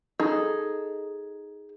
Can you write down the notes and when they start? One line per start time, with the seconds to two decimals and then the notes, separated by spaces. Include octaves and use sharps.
0.20 D#4 G#4 A4